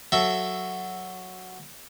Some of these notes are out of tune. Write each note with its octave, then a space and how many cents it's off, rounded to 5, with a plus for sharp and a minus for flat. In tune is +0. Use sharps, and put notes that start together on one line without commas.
F#3 +0 A4 +0 E5 +0